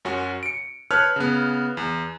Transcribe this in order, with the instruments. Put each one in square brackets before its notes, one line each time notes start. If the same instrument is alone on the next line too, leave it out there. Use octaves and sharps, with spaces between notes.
[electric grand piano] F#2 C#4 F#4
C#7 D7
B4 C#5 A5 F6 F#6 G#6
C#3 B3
E2